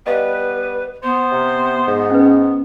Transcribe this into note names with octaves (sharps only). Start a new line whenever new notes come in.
G3 B3 B4 D#5 F5
B3 C5
C3
G#2
C#4 B4